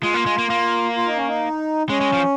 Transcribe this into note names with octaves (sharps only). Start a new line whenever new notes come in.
G#3 F4
A#3
G#3
A#3
A#3
F4
D#4
C#4
D#4
G#3 C#4
G#3
F3